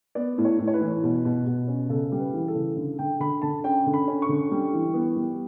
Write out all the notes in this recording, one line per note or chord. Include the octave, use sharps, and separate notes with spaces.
B3 D5
A2
C#5
A2
C#5
B4
E3
B2
B2
B2
C#4
C#3 A4
G3
B4
E3
A4
C#3
D3
D3 G5
D3 B5
D3 A5
C#4 G5
D3
B5
C#4
C#6
D3
G3
E3
B3
G3